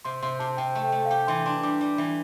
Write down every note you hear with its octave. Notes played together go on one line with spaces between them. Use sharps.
C3 C6
C3 C6
C3 A5
C3 G5
A3
G5
A3
F5
G4 G5
E3 C6
D4 C6
G3 D6
G3
E3